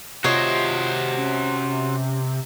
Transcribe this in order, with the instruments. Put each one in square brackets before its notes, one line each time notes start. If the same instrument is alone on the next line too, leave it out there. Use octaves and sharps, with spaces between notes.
[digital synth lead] C3 [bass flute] F4 [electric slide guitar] F#4 C5 [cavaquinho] C#5 D#5
[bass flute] C#4